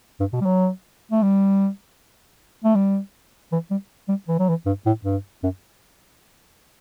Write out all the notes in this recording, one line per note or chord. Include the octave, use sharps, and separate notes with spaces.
G2
B2
G3
F#3
A3
G3
A3
G3
E3
G3
G3
E3
F#3
E3
G2
A2
G2
F#2